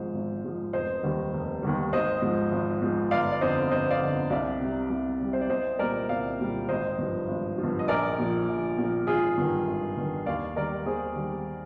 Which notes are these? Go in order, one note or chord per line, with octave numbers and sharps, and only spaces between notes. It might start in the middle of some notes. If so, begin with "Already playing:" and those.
Already playing: G#1 G#2 F3 C5
G#1
G#2 F3
F1 C5 D#5
D#2 D#3 G3
F1
D#2 D#3 G3
G#1 C5 D#5
G#2 F3
G#1
G#2 F3
G1 D5 F5
D5
F2 D3 C5 D#5
G1 C5 D#5
D5 F5
F2 D3
C2 D5 F5
C3 G3
C2
C3 G3
C5
D5
C2 C5 D#5
A#2 G3 A#4 D5
C2 D5 F5
A#2 G3
G#1 C5 D#5
G2 F3
G#1
F3
G2
D#5
A#1 A#4 D5
A#2 F3
A#1
A#2 F3
G#1 F4 G#4
G2 D#3
G#1
G2 D#3
D#2 D5 F5
D#3 G3 A#4 D5
D#2 G#4 C5
D#3 G3